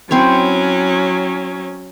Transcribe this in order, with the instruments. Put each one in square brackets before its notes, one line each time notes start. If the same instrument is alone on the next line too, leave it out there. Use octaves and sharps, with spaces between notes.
[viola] F#3 C#4 [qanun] C4 E4 C#5